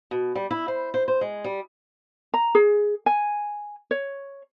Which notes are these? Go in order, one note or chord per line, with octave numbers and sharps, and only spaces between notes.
B2
G3
E4
C5
C5
C5
G#3
G3
A#5
G#4
G#5
C#5